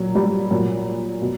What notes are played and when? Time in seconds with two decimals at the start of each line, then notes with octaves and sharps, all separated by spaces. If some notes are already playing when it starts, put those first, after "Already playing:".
Already playing: A#2 F#3
0.15 G3
0.50 A#2 F#3
1.22 B2